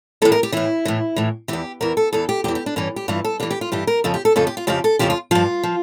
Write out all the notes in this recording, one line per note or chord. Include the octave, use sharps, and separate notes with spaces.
A2 E3 A4
A#4
G4
A2 E3 E4
A2 E3
A2 E3
E2 E3 G4
E2 E3 A#4
A4
E2 E3 A4
G4
E2 E3 G4
G4
D4
G2 E3 C#4
G4
G2 E3 F4
A4
G2 E3 G4
G4
F4
G2 E3 G4
A#4
F2 C#3 F3 A4
G4
A4
F2 C#3 F3 A4
G4
F4
F2 C#3 F3 G4
A4
F2 C#3 F3 G4
F4
G2 F3 F4
F3